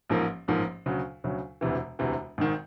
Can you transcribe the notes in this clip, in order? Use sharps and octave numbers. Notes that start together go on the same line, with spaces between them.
A1 G#2 F3 A#3
A1 G#2 F3 A#3
D2 C#3 F#3
D2 C#3 F#3
E1 D2 C3 E3
E1 D2 C3 E3
G#1 G#2 D#3